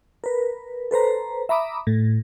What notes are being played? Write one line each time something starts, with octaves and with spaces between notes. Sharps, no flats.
A#4 B4
A4 B4 C5 A#5
E5 A#5 B5 D6 D#6
A2